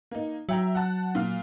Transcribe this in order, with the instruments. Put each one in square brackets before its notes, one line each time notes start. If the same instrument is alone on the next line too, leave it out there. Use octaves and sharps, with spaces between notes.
[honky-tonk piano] A#3 D#4
[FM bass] F#3 [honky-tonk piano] E5 G5 A#5
[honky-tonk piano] F#5 A5 F#6
A#2 F5 F6